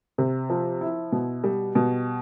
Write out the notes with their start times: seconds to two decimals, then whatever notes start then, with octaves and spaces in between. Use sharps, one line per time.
0.18 C3
0.50 F3
0.81 E4
1.12 B2
1.44 G3
1.75 B2